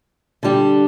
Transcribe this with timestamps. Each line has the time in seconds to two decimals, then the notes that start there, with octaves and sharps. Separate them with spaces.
0.43 D3 G3 D4 G4